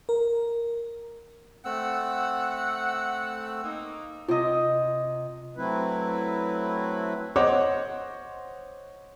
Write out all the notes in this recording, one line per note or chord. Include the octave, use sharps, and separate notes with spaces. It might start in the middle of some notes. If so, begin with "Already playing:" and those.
A#4
A3 C4 F#5 E6
A#3 D#4
C3 F4 D#5
F#3 A3 C4 E4 B4
C5 C#5 D#5 F#5 D6